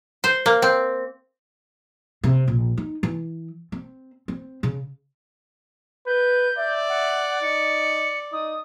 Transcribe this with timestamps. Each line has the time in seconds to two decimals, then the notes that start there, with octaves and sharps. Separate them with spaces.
0.24 C5
0.46 A#3
0.62 C4
2.24 C3
2.48 A#1
2.78 D#4
3.03 E3
3.72 C4
4.28 C4
4.63 C#3
6.07 B4 G6
6.58 D5 E5
6.89 F#5
7.42 D#4 C#7
8.33 D#4 D#6